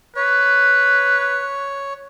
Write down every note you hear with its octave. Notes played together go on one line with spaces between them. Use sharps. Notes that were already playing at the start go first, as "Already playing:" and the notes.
B4 C#5